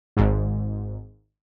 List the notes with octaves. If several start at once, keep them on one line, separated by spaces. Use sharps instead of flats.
G#1 G#2